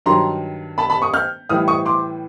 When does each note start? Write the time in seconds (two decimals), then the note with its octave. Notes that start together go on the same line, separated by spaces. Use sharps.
0.06 G2 D#3 F#3 A#5 C6
0.78 A5 B5
0.90 A5 B5
1.02 C#6 D#6
1.14 F6 G6
1.49 A2 E3 G3 D#6 F6
1.68 C#6 D#6
1.86 C6 D6